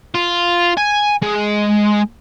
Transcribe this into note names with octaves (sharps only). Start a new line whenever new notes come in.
F4
G#5
G#3